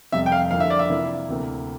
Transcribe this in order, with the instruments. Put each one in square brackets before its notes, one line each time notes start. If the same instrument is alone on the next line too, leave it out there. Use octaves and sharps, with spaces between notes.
[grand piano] F2 C3 G3 [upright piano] E5
[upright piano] G5
F5
[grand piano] D3 F3 A#3 E4 [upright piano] F5
[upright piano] E5
D5
E5
[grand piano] C3 E3 A#3 E4
D2 C3 E3 A#3